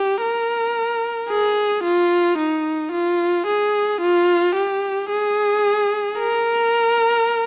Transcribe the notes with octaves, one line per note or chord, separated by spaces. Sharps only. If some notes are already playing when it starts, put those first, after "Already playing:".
Already playing: G4
A#4
G#4
F4
D#4
F4
G#4
F4
G4
G#4
A#4